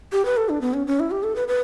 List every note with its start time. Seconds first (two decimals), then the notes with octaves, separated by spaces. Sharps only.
0.12 G4
0.25 B4
0.37 A4
0.49 D4
0.61 B3
0.73 C#4
0.87 C#4
0.99 E4
1.11 G4
1.23 A4
1.36 B4
1.48 B4